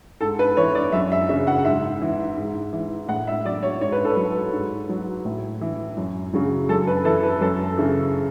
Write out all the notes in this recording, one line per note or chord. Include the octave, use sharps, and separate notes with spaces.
G#2 A4
B4
E3 C#5
D5
F#2 E5
E5
C#3 F#3 E5
F#5
G#2 E5
E3
G#2
E3
A2 F#5
E5
F#3 D5
C#5
G#2 C#5
B4
A4
F#3 B4
G#2
F#3
A2
E3
F#2
C#3 F#3
F#2 A4
B4
E3 A4
B4
F#2 A4
C#3 E3